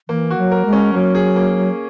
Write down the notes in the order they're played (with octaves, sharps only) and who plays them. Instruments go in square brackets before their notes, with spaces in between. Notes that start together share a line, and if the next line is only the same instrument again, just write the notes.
[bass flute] E3 [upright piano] A#3
[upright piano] F#4
[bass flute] F#3
[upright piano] A#4
[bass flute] G#3
[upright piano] C#4
[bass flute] F#3 [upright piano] A#3
[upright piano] G#4
A#3